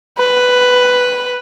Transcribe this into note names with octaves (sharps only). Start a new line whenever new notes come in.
B4